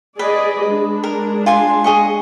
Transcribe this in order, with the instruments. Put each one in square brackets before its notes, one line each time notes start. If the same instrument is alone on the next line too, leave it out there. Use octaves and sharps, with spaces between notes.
[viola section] G#4 D5 D#5 [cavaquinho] B4
[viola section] G#3 D4
[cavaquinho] A#4
F4 G#5 C6
G#4 D#5 C#6